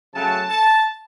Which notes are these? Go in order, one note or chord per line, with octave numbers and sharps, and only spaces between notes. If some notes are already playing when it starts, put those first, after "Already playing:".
C#3 F#3 A3 C#4 A5
A5